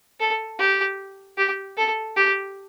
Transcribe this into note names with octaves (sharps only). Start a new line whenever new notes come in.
A4
G4
G4
A4
G4